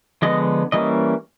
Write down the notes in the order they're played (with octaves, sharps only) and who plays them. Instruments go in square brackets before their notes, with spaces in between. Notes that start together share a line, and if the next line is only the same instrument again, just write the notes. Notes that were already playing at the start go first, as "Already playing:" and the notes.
[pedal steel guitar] D3 F3 G#3 B3 D#5
E3 G3 A#3 C#4 D#5